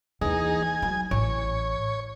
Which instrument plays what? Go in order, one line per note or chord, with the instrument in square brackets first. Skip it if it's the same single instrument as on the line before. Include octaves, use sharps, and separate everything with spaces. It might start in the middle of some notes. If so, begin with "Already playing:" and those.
[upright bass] D#2 E3 [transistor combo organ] D#4 G#4
[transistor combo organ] G#5
[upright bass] F#3
[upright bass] A1 [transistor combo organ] C#5